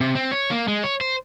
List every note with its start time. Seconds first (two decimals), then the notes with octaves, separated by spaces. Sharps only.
0.01 C3
0.15 C4
0.31 C#5
0.51 A#3
0.68 G#3
0.84 C#5
1.01 C5